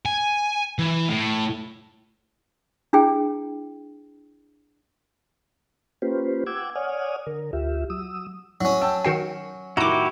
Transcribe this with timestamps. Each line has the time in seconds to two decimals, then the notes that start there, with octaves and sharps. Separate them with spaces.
0.05 G#5
0.79 E3
1.09 A2
2.93 D4 E4 G#4 G5
6.02 A#3 C#4 F4 G4 B4 C5
6.46 F#5 G5 D6 E6 G#6
6.76 C#5 D5 F#5 G#5 D#6 F6
7.27 D3 A#4
7.53 D2 F4 G4 E5
7.90 F#3 D#6 E6
8.61 A2 F#3 C#4
8.81 G5 A5 E6
9.05 D#3 F#4 G5 C7 C#7 E7
9.77 A2 D#3 E4 F#4 G4 A#5 D6